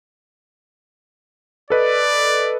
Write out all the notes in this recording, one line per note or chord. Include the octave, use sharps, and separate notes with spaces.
A4 B4 D5 D#5